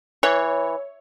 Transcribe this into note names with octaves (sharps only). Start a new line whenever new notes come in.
E3 C#5